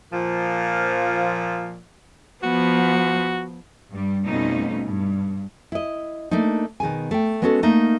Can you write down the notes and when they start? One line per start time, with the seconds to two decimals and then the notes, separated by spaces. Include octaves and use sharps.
0.13 A#2 F3
2.43 F3 B3 F#4
3.92 G2 G3
4.25 F2 B2 G3 A3 C#4 D#4
4.85 G2
5.72 E4 D#5
6.31 A3 A#3 D4 D#4
6.80 B2 D#3 G#4 G#5
7.11 A3 G5
7.42 G#3 B3 C#4 F#4 G4 A4
7.63 A3 A#3 D#4